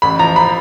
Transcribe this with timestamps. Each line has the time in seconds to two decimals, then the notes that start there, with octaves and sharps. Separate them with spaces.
0.02 A1 B5
0.19 F3 A#5
0.36 B5